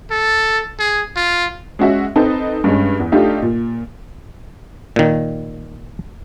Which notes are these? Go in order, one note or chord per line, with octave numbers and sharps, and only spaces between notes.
A4
G#4
F4
G#3 C#4 F#4 E5
C4 D#4 A4 B4
G2 G#3 C#4
E2
A3 D4 D#4 F4 G4
A#2
A#2 D#3